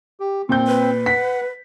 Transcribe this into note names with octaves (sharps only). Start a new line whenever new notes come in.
G4
A#2 C4 G6
B4
F#5 B6